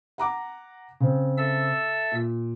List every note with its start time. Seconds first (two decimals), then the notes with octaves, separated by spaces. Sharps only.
0.18 F#5 A#5 D6
1.00 C#3 C4
1.38 A4 E5 E6
2.12 A#2